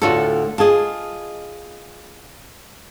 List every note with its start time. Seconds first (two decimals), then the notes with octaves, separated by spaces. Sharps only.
0.02 D2 A2 F4 F#4 A4
0.58 F4 G#4 D#5 A5